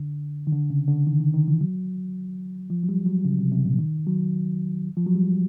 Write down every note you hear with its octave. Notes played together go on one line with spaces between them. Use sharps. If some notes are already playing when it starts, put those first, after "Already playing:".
Already playing: D3
D#3
D3
C#3
D3
D#3
D#3
D#3
E3
F#3
F3
F#3
G3
F#3
C#3
C3
C3
A#2
D#3
F#3
F3
F#3
G3